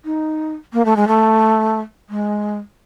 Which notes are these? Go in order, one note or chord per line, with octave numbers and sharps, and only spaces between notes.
D#4
A#3
A3
G#3
A3
G#3